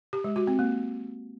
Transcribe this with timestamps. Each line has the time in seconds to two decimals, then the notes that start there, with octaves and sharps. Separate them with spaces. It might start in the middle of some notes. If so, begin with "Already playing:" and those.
0.13 G4
0.24 G#3
0.36 F#4
0.47 C4
0.59 A#3